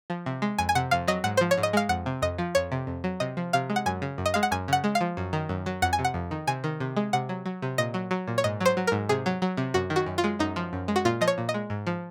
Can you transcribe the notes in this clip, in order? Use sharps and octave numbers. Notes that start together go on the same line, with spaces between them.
F3
C3
G#3
F2 G#5
G#5
C3 F#5
F2 F5
F#3 D#5
G#2 F#5
F3 C5
C#5
G#2
D#5
G#3 F5
F2 F#5
C3
F2 D#5
F3
F2 C#5
C3
F2
F#3
C3 D#5
F3
C3 F5
G#3
F#5
F#2 G#5
C#3
F#2
D#5
G#3 F5
F#5
F#2 G#5
C#3 F#5
G#3
F5
F3
F#2
D#3
F#2
F#3
F2 F#5
G#5
C3
F#5
F2
D#3
C3 G#5
D#3
C3
G#3
C3 F#5
F#3
F#3
C3
A#2 D#5
F#3
F#3
A#2
C#5
G#2 D#5
F#3 C5
F#3
G#2 A#4
C3 G#4
F#3
F#3
C3
F#2 F#4
D#3
F#4
F#2
F4
G#3
F#2 D#4
F3
F#2
G#3
F#4
A#2 F4
F3 D#5
C#5
A#2
D#5
G#3
G#2
F3